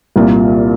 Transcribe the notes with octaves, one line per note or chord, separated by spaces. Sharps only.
C2 A#2 A#3 F4